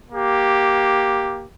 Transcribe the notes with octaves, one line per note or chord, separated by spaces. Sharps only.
A#3 G4